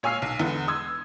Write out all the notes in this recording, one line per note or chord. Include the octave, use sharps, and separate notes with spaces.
A#2 C#5 G#5 E6 F6 C7
B1
E2 D3 B3
C6 D#6 E6 G#6